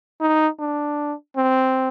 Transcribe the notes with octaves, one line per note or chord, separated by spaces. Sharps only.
D#4
D4
C4